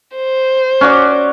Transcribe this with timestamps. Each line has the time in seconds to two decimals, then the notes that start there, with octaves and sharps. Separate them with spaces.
0.16 C5
0.81 C#4 F#4 D5